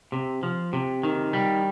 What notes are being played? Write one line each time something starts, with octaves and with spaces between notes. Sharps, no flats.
C3
F3
C3
D#3
G3